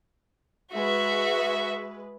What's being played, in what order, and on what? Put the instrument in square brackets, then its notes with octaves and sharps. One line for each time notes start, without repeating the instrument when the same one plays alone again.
[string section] G#3 B4 [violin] F#4 E5